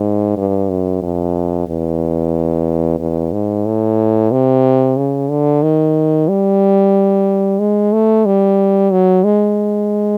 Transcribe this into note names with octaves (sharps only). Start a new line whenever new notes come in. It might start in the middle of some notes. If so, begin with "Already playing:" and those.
Already playing: G#2
G2
F#2
F2
E2
E2
G#2
A2
C3
C#3
D3
D#3
G3
G#3
A3
G3
F#3
G#3